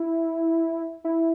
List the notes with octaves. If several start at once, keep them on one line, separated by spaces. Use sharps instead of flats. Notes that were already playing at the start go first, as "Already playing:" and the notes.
Already playing: E4
E4